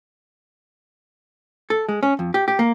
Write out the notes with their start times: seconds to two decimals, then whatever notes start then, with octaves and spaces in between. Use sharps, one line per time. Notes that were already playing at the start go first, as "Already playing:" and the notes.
1.70 A4
1.89 G#3
2.03 C#4
2.19 F2
2.34 G4
2.48 G4
2.59 A#3